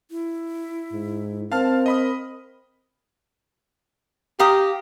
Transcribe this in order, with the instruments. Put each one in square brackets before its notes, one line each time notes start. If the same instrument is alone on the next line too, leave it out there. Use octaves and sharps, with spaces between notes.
[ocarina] E4
[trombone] G#2
[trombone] C4 [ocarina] A#4 [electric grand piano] F5 A5 F6
[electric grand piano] D#5 B5 D#6
[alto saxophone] G4 [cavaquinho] F5 A#5 D#6